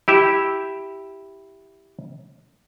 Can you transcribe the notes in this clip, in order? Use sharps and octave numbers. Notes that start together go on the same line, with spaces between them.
E4 G4 E5